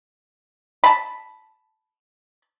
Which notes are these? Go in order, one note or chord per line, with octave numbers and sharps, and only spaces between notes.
A5 B5